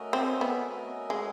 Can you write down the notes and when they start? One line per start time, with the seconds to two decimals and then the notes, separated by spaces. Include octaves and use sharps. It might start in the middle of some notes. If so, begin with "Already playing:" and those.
Already playing: A3 C#4 F#4 A#4 D#5
0.13 C4
0.41 B3
0.68 A3 C#4 F#4 A#4 D#5
1.10 G#3